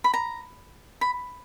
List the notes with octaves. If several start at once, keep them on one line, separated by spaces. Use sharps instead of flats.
B5
A#5
B5